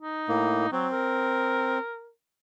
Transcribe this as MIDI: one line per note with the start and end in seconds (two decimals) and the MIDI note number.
0.01 0.70 63
0.28 0.66 45
0.28 0.66 58
0.72 0.87 54
0.72 1.79 60
0.92 2.11 70